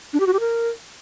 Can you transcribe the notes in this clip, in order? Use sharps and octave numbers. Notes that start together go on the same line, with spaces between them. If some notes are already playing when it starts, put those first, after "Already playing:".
D4
G4
F#4
G4
A#4